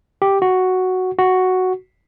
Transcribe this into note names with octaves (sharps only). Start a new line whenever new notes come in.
G4
F#4
F#4